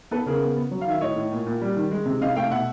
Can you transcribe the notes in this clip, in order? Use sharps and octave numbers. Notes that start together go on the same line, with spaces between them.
B3 A4 B4
C#3 G#4 A#4
B3
B3
F#3
F5
D#3 E5
A2 C#5 D#5
A2
A#2
A#2
G3
D#3
G#3
C3
C3 D#5 F5
A3 F5 G5
B2 E5 F#5